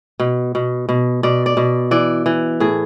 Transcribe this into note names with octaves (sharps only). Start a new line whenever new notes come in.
B2
B2
B2
B2 D5
D5
B2
E3 D5
E3
A2 G#4